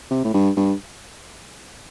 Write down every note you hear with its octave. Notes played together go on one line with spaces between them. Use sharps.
C3
A2
G2
G2